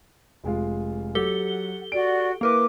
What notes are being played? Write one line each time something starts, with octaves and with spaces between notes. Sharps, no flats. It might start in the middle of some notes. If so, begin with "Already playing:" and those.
F1 G#3 F4
F#3 G4 A4 F#5 G7
F#4 D5 F#5 D7
A#3 E4 A#4 B4 D6